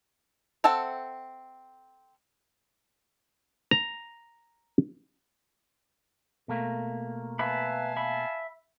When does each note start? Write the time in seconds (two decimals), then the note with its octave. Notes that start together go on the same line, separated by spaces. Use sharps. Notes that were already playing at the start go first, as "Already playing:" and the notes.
0.64 C4 A4 E5 F#5 A5
3.71 A#5
6.48 B2 A3 A#3
7.39 B4 E5 F5 G#5 A5 B5
7.96 E5 B5